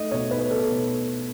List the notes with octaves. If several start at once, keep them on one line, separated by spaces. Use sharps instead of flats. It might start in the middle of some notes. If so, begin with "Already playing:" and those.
Already playing: A3 D#4 D#5
B2 C#5
D#4 B4
B2 A4
B2